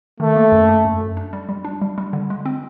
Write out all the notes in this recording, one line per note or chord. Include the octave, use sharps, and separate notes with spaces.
D#3 A3
A#3
F#2
A#3
F#2
F#2
D4
G3
G3
D4
G3
G3
D3
G#3
C4